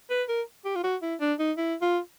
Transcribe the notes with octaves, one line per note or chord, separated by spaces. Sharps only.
B4
A#4
G4
F4
F#4
E4
D4
D#4
E4
F4